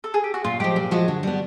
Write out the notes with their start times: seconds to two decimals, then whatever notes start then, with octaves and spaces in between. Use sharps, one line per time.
0.04 A4
0.14 G#4
0.24 G4
0.34 F#4
0.44 A#2 F4
0.60 F3 G#3 G4
0.76 A#2
0.91 F3 G#3 F#4
1.08 D3
1.23 G3 B3